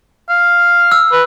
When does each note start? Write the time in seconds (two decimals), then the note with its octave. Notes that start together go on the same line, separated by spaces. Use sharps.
0.29 F5
0.92 E6
1.12 B4